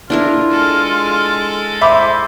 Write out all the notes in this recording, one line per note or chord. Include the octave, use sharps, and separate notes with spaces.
D4 E4 F4 A#4
G#3 A4
C5 E5 B5 D6